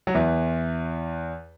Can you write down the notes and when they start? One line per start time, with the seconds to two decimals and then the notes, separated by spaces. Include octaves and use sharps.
0.07 F#3
0.14 E2 E3